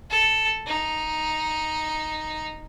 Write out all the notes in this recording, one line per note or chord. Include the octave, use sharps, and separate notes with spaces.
A4
D#4